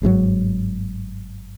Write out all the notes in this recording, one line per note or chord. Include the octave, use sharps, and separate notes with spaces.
G1 G#2 B2 F#3